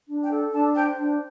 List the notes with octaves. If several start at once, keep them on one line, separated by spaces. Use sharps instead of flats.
D4
G5
A4
D4 A5
C5 G5
D4